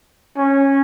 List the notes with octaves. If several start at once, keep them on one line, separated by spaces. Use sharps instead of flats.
C#4